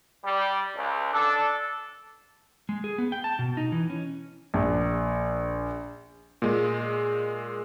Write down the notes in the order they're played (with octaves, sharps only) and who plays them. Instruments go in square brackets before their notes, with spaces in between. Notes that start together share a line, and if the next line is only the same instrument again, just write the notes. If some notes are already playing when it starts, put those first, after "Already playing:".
[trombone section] G3
C#2
D4 A4
[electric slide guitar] G#3
G#4
B3
G5
A5
B2
D#4
E3
C#4
[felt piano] A#1
[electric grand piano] A#2 G#3